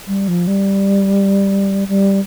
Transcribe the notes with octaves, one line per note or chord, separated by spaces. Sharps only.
G3
F3
G3
G3